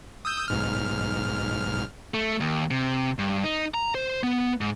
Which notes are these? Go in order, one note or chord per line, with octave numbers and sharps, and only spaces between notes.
D#6 E6 G6
B1 G#2 F6
A3
D#2
C3
G2
D#4
A#5
C5
B3
G#2